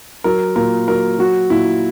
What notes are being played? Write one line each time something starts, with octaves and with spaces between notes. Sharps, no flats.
F#3 A#4
A#2 A#4
F#3 A#4
F#3 F#4
A#2 E4